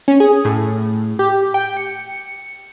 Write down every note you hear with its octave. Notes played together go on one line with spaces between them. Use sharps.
C#4
G#4
A2
G4
G5
C#7